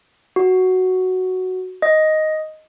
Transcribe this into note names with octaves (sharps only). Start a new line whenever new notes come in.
F#4
D#5